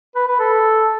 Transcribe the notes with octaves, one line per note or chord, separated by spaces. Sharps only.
B4
B4
A4